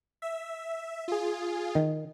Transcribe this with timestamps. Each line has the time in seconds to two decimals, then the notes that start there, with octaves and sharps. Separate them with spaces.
0.22 E5
1.08 F4 G#4
1.75 D#3